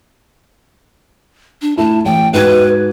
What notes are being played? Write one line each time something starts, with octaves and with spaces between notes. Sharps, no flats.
D4
A3 E4 A5
A1 G5
G#2 F#4 B4 G#6